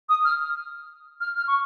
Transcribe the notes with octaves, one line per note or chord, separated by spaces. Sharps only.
D#6
F6
F6
F6
C#6